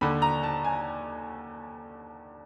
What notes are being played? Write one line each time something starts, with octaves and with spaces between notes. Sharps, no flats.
D#2 D3 B5
A#5
A5
G#5